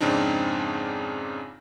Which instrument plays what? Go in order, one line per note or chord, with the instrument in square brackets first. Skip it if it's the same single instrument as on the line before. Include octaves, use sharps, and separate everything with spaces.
[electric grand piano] F2 G#2 C#3 C4 D4 D#4